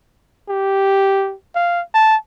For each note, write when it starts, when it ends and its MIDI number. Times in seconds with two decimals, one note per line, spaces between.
0.49 1.34 67
1.56 1.82 77
1.94 2.16 81